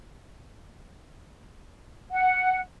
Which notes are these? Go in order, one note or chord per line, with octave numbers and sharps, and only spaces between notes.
F#5